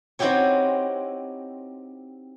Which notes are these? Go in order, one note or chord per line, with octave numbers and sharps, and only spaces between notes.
C4 D#4 E4 F#4 G4 C#5